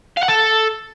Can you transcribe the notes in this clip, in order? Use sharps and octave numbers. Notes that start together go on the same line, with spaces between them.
F5
F#5
A4